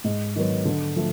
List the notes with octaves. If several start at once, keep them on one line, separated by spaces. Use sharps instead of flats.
G#2
D#3 F#3 B3
D3
F3 A3